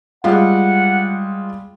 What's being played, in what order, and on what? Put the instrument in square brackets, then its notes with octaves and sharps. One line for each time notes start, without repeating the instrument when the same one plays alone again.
[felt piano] G3 G#3 F4 [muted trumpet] F#5